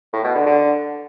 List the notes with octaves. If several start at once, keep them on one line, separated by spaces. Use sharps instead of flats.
A2
B2
D3
D3